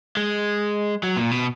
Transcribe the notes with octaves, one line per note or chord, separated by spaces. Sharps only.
G#3
F#3
A#2
B2